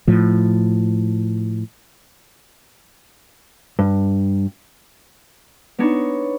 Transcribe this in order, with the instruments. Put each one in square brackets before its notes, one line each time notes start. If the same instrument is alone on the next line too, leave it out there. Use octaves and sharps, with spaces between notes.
[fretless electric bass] A2 F3
[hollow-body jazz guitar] G2
[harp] B3 D4 D#4 C#5